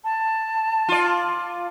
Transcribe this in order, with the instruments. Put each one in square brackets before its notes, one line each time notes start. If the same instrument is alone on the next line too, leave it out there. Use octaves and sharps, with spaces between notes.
[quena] A5
[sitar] F4 D5